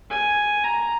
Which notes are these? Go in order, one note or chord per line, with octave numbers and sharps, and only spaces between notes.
G#5
A#5